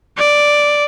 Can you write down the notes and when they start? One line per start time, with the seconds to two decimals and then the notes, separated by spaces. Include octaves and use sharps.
0.19 D5